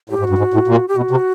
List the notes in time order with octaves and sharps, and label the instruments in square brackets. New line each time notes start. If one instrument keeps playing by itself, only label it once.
[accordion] A2 [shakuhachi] G4
[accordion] G#2
[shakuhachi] F#4
[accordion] G2
G#2
A2
A#2
[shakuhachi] G4
[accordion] B2 [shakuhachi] F#4
[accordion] C3